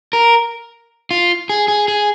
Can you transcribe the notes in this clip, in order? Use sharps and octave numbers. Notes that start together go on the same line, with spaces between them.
A#4
F4
G#4
G#4
G#4